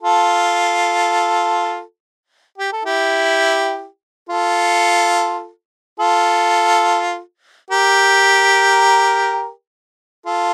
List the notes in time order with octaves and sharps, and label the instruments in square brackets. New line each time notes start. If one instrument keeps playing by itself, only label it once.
[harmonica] F4 A4
G4
A4
E4 G4
F4 A4
F4 A4
G4 A#4
F4 A4